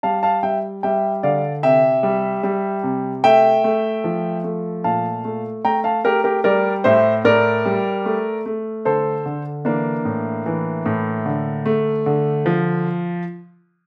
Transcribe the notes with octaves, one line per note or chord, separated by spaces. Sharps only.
G3 F5 A5
F5 A5
G3 E5 G5
G3 E5 G5
D3 D5 F5
C3 E5 G5
G3
G3
C3
A3 E5 G5
A3
F3
A3
A#2 F5 A5
A3
A3 G5 A#5
F5 A5
A3 G4 A#4
G4 A#4
G3 A#4 D5
A2 C5 E5
A2 A#4 D5
G3
A3
A3
D3 A4 C5
D3
E3 A#3 D4
A2
E3
A2
D3
A3
D3
F3